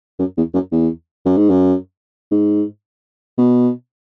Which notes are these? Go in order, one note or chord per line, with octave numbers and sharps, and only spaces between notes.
F#2
E2
F#2
E2
F#2
G#2
F#2
G#2
B2